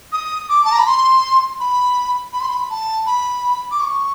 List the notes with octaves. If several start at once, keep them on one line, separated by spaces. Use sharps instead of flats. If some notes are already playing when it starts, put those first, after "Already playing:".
D#6
D6
A5
A#5
B5
C6
B5
B5
C6
B5
A5
B5
D6
C#6